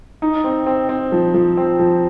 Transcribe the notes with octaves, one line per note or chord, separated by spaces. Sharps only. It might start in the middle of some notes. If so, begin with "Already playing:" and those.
D#4
C4
C4
C4
F3
F3
C4
F3